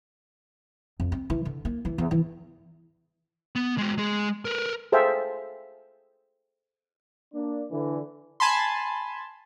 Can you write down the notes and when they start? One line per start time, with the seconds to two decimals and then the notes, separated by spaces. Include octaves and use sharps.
1.00 F2
1.12 C4
1.30 E3
1.45 D3
1.65 A#3
1.85 E3
1.98 E2
2.11 E3
3.56 B3
3.78 G#3 F#4
3.98 G#3 G#4
4.45 A#4 B4
4.92 G#4 A4 C5 E5 F5 G5
7.33 A#3 D4
7.70 D3 E3
8.40 G#5 A5 B5 C6